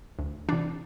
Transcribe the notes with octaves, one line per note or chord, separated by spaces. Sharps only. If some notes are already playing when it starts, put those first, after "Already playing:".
D2
C3 E3 D4